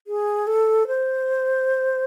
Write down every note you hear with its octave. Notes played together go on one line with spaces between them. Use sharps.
G#4
A4
C5